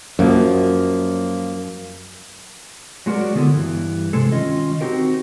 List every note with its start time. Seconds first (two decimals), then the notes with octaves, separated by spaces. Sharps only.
0.19 F#2 F3 A#3
3.06 F#3 G#3 F#4 A#4 D5
3.35 D3 B3 E4 A4
3.54 G2 E3
4.13 C3 G#3 A4
4.32 D#3 C#4 F4 D#5
4.81 C4 D#4 F#4 G4 A#4